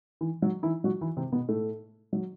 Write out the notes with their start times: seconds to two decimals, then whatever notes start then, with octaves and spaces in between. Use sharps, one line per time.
0.21 E3
0.42 F#3
0.63 E3 E4
0.84 F#3 F#4
1.01 E3 E4
1.17 C3 C4
1.32 B2 B3
1.48 A2 A3
2.13 F#3